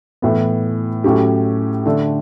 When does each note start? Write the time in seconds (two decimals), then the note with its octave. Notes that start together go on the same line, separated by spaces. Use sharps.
0.22 A2 E3 B3
1.04 A2 F#3 C#4 G4
1.85 D3 A3 D4 A4